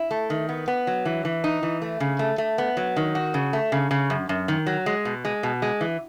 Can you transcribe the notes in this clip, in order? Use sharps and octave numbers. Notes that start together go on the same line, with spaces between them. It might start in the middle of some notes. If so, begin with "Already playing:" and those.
Already playing: E4
A3
D#3
B3
B3
F#3
E3
E3
D#4
E3
A3
C#3
A3
A3
B3
F#3
D#3
F#4
C#3
A3
C#3
C#3
F#2
F#2
D#3
F#3
G#3
B2
G#3
B2
G#3
E3